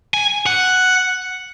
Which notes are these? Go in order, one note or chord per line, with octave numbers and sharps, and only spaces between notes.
G#5
F#5